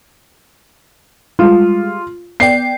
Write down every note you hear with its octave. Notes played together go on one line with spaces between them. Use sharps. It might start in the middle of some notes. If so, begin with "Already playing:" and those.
G3 G#3 F4
B3 D5 G5 C7